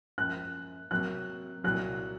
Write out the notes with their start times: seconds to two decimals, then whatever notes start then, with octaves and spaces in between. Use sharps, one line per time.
0.18 F#2 F3 A#3 F#6
0.91 C3 F#3 A#3 F#6
1.64 C2 A#2 F#3 F#6